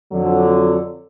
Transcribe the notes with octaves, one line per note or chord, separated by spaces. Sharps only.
F2 D3 F#3